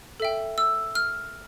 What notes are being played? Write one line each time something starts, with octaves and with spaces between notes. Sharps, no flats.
A4 E5 G5
E6
F6